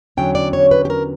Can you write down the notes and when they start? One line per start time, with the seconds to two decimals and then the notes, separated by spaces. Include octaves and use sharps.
0.17 E2 D3 F#3 C#4 G5
0.35 D5
0.53 C#5
0.71 B4
0.85 G4
0.90 A#4